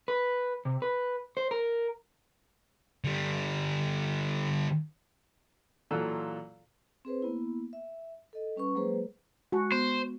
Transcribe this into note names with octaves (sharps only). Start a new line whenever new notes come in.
B4
C3
B4
C5
A#4
D3 G3
A#2 E3 F#3 F4 A4 E6
C4 G#4 B4 C5
A#3 B3 E4
E5
A4 D#5
G3 C#4 B4 C#6
F#3 G#3 A#3 G#4 B4 C5
G#3 F#4 G#5 A5
B3 C5